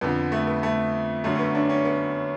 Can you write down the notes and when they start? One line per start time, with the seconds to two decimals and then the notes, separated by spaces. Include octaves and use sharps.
0.01 F2 D3 B3
0.32 A3
0.47 B3
0.63 A3
1.24 F#2 D3 A3
1.35 C#4
1.39 B3
1.55 D4
1.69 C#4
1.85 B3